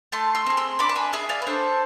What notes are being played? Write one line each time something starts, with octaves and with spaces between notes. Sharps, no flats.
A3 A5 C6
C6 E6
C4 G#4
C6 E6
D4 B5 D6
A5
G#5 B5
G#4 E5 G#5
D5 F5
B4
D4 A4 C5